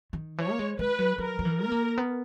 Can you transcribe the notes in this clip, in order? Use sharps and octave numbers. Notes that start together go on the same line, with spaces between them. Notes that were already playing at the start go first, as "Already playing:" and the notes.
D#3
E3 C#5
A#3
G#3
G#3 B4
F#3
F#3 A#4
F#3
E3
A#4
B3
A#3
B3